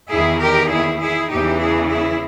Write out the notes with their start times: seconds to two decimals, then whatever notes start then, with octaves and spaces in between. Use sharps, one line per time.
0.13 E2 D#3 E4 G#4
0.42 G4 A#4
0.72 E4 G#4
1.01 E4 G#4
1.31 E2 C#3 E3 D#4 G4
1.61 E4 G#4
1.90 E4 G#4